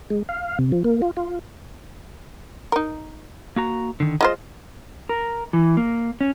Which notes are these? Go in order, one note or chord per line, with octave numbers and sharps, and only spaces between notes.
G#3
F5
C3
F3
A#3
F4
F4
D#4 A#4
A#3 F#4 A#5
D3 D#3
G#3 F4 C5 D#5
A#4
E3
A#3
C#4